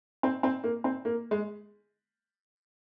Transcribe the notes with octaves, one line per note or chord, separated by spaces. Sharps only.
C4
C4
A#3
C4
A#3
G#3